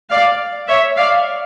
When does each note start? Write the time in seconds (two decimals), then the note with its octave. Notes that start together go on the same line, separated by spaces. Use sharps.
0.10 D5 F5
0.68 C#5 E5
0.96 D5 F5